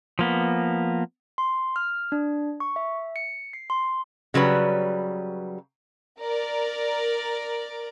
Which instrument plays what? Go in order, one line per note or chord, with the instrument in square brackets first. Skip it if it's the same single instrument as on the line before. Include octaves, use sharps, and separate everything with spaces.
[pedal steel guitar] F3 A#3 B3
[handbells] C6
F6
D4
C#6
E5
C#7
C7
C6
[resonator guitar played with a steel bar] C#3 F#3 G3 B4
[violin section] A#4 D5